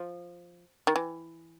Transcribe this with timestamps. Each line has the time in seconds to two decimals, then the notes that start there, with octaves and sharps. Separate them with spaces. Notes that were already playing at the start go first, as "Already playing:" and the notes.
Already playing: F3
0.87 D#3
0.96 E3